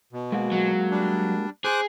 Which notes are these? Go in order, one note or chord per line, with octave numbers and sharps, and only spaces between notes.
B2
G#3 A#3 F#4
F#3
G3 D4
G#4 C5 D6 F#6